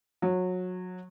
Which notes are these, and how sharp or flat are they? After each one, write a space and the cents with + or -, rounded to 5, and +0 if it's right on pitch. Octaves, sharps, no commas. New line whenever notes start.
F#3 -20